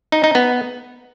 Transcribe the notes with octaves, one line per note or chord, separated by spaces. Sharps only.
D#4
D#4
B3